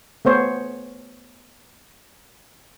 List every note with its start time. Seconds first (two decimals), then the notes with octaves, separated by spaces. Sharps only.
0.25 A3 B3 C5 C#5